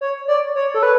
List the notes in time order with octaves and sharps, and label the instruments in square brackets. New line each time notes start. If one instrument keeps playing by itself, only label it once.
[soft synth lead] C#5
D5
C#5
A4
B4